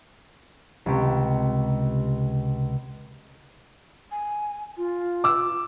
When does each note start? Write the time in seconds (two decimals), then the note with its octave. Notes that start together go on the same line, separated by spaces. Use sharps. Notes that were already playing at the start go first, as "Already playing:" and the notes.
0.86 C#2 C3 G4
4.12 G#5
4.77 F4
5.24 D6 E6